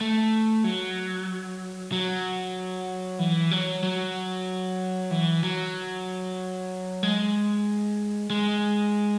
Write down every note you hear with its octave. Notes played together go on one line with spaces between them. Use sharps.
A3
F#3
F#3
E3
F#3
F#3
E3
F#3
G#3
G#3